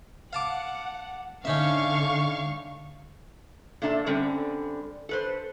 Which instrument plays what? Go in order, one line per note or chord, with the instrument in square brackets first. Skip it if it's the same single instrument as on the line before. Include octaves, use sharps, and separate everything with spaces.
[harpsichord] F5 A5 D6 [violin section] F#5
[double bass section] D3 [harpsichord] C#4 D#4 E5 [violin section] F5 C#6
[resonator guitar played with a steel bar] A#2 A3 D4 E5 A5
D3 G3 C4 C#4
A4 B4 C5